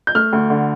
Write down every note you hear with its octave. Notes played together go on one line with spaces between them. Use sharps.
G6
A3 F6
D2
D3